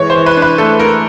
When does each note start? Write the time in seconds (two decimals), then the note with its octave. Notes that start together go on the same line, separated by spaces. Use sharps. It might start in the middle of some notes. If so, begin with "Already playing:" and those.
Already playing: E3 G#3 C#5
0.10 C5
0.16 E3
0.26 B4
0.37 D4
0.42 B4
0.58 A3 A4
0.79 A3 A#4